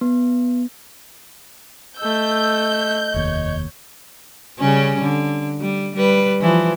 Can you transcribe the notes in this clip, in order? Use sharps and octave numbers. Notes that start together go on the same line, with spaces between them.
B3
A3 D#5 E6 G6
F1 D#2 C#5
C#3 G3 C#4
D3
G3
G3 B4
E3 F3